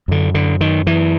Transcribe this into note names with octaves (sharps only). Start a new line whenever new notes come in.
F#2 D3
D3
D#3
E3